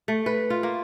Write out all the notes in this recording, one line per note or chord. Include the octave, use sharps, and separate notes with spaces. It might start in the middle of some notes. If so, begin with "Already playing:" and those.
A3
B4
F4
A#3